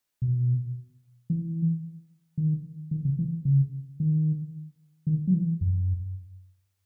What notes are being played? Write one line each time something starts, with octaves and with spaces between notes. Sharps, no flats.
B2
E3
D#3
D#3
C#3
E3
C#3
D#3
D#3
F#3
E3
F#2